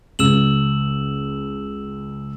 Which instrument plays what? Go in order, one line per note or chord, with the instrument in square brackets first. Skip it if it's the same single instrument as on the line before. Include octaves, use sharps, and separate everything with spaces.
[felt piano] C#2 [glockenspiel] E6 E7 F#7